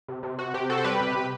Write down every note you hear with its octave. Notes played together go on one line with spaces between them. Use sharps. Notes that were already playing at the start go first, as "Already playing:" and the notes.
C3
C3
C3 F#4
C3 G4
C4 F#4 A4
C5
G3 G4 B4
C3
C3